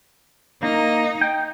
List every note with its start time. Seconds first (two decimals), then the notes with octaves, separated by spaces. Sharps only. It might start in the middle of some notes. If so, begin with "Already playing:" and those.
0.63 A#3 D#4
1.21 G5